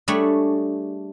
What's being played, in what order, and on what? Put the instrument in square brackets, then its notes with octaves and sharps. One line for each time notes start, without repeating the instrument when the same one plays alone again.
[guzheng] G3 A3 D4 G#4 C#5